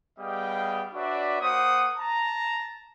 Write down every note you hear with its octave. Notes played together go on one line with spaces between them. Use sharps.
G3 B3 G#4 D#5 F5 G5
D4 F#4 B4 C#5 D5 E5
A#3 C5 F#5 C#6 D#6
A5 A#5